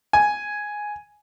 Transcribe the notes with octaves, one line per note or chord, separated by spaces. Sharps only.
G#5